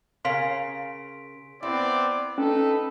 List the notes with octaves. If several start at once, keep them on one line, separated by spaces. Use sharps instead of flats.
C#3 A#4 F5 C6 B6 D7
B3 C4 E4 D5
C#4 D#4 A4 B4